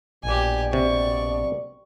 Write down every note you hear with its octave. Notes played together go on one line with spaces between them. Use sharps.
A#1 B2 G4 D5 G#5
C3 C#6